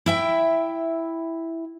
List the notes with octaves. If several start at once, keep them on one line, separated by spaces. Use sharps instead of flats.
E4 E5 G5